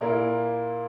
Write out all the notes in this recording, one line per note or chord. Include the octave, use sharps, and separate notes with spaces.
A#2 A#3 E4